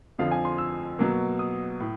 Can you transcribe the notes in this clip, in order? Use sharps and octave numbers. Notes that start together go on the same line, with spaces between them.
F2 D3 F3 F5
G#5
C6
E6
B2 F#3 A#3
D#6
A2